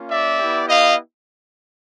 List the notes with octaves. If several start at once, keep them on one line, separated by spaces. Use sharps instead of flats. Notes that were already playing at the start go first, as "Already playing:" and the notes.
Already playing: A#3 C#4 F4
D5 E5
B3 E4 G4
D#5 F5